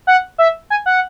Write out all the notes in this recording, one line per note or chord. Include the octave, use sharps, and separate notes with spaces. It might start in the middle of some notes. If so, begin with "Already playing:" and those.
F#5
E5
G#5
F#5